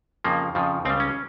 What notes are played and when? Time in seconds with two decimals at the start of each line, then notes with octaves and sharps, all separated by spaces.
0.24 F2 C#3 F3 A#3
0.55 F2 C#3 F3
0.85 C#2 C#3 G3 C4
1.00 C#4